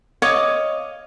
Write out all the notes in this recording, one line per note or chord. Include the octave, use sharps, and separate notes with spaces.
C#5 D#5 F5 D6